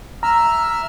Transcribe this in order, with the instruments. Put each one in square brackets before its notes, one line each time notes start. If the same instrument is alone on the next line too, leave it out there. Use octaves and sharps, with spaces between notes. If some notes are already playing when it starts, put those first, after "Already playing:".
[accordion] E5 E6 F6 [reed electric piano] A#5